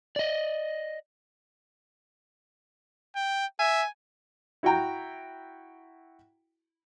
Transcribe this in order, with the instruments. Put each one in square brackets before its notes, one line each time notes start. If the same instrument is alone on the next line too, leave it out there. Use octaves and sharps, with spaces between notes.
[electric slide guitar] D5 D#5
[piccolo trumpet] G5
[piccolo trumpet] E5 [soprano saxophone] G#5
[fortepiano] E4 F#4 E5 G5 A#5